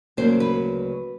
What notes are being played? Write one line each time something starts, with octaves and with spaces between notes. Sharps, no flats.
D2 C#3 F#3 A#3 C5
B4